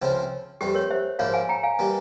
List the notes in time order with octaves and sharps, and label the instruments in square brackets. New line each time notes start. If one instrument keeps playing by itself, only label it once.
[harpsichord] C#2 C#3 F3 C4 E4
[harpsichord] F2 E3 G3 [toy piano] G4
[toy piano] A#4 C#5
C5 E5
[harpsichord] G#2 F3 A#3 E4 [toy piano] C#5 F5
[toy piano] F5 G#5
G5 A#5
F5 G#5
[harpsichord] E3 G3 A#3